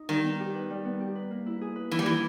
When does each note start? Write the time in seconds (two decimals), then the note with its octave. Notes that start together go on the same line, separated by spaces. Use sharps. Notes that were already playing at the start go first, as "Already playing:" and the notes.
Already playing: D#4
0.09 D#3 G3
0.24 B3
0.40 G4
0.55 B4
0.70 G3
0.85 B3
1.00 G4
1.15 B4
1.30 A#3
1.46 E4
1.61 G#4
1.76 B4
1.91 E3 A#3
1.99 G3
2.06 E3 E4